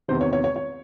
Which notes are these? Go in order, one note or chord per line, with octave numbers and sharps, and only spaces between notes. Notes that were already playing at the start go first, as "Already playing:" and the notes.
E2 C3 D#3 C5
C#5
C#5
C#5
C#5